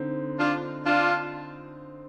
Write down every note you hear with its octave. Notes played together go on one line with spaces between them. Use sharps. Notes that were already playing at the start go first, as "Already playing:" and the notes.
Already playing: D3 C4 D#4
D4 F4
D4 F4